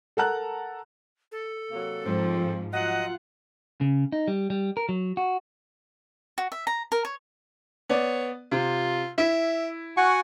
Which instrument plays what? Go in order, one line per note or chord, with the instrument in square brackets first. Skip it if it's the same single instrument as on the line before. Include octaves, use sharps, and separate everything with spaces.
[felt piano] A4 A#4 F#5 A5 A#5 F#6
[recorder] A4
[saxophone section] C3 F#3 A#3
[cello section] G#2 F3 [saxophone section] C4
[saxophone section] F#3 F#5 [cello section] F4 [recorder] D#5
[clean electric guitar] C#3
D#4
G3
G3
A#4
F#3
F#4
[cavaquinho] F#4
E5
A#5
A#4
C#5
[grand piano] B3 D5 [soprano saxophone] C#5
[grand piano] C3 [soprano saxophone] F4
[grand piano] E4 [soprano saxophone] E5
[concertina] F#4 F#5 G#5 [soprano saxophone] C#6